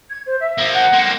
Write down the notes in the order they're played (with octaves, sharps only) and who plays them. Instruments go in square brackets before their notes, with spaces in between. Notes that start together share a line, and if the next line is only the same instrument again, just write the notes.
[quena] G#6
C5
E5
[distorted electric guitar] F3 A#3
[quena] F#5
[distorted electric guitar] A#3 C4